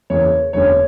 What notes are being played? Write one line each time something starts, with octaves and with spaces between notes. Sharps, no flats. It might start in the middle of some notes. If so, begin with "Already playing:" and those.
E2 C#3 E3 A#3 C#5
E1 E2 D3 A#3 C#4 C#5